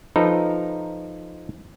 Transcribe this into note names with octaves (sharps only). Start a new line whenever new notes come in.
F3 D#4 A4 B4 A#5